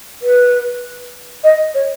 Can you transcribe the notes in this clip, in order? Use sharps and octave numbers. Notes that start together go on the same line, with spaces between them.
B4
D#5
C#5